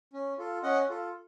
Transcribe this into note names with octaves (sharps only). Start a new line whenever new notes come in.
C#4
F4 A4
C#4 D#5 F#5
F4 A4